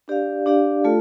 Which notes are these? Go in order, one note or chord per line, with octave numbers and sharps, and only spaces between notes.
D4 G4 D5 F5
D4 G4 D5 F5
A3 F4 A4